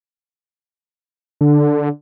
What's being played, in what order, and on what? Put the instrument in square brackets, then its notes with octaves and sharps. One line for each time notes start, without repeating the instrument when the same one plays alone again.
[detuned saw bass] D3